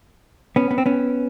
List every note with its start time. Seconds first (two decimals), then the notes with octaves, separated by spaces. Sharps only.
0.56 B3 C#4
0.71 B3
0.78 C4
0.86 B3 C#4